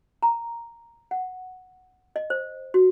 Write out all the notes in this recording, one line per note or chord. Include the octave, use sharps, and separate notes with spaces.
A#5
F#5
D#5
C5
F#4